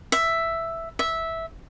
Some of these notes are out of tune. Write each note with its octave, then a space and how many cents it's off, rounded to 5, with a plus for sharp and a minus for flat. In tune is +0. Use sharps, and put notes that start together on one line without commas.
E5 +5
E5 -10